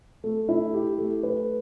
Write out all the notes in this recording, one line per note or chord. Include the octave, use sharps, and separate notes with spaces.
A3
E4
G4
A3
B4